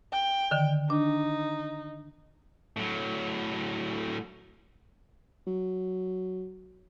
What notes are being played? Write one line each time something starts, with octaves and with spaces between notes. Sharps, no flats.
G5
D3 D#3
D4 D#4
A2 F#3
F#3